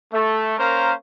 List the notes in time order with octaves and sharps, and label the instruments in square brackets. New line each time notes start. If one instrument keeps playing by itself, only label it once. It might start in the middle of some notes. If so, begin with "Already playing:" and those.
[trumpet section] A3
A#3 C#4 A#4 C5 F5 A#5